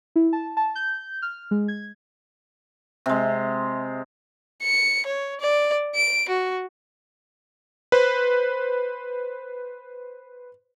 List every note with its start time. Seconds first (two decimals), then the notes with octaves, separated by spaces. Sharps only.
0.16 E4
0.33 A5
0.57 A5
0.75 G6
1.22 F6
1.51 G#3
1.68 G#6
3.06 C3 G#3
4.63 C#7
5.06 C#5
5.40 D5
5.95 D7
6.29 F#4
7.92 B4 C5